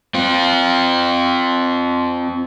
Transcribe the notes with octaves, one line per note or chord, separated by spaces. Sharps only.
C4 F4